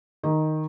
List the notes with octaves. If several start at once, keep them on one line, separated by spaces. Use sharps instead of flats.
D#3